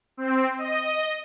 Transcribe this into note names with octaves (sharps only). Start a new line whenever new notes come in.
C4
D#5